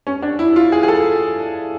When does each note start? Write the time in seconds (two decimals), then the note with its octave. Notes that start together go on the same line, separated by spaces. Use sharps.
0.07 C#4
0.22 D4
0.39 E4
0.56 F4
0.72 G#4
0.83 G#4
0.88 A4